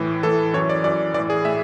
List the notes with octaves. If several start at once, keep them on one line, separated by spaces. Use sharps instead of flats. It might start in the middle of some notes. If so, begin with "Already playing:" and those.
Already playing: A2 E3
A2 E3 A4
F#2 E3 C#5
D5
F#2 E3 D5
A2 E3 D5
G#4
A2 E5